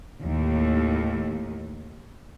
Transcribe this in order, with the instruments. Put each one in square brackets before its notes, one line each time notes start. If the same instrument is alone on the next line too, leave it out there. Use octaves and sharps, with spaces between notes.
[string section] D#2 A2